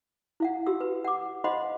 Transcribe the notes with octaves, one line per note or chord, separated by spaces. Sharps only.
E4 F5 F#5
F#4 G4 E6
B4
F#5 D6
C5 D#5 F5 F#5 B5 C6